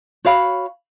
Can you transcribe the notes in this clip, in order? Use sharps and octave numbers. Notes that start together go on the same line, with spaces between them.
F#4 C#5 F5 B5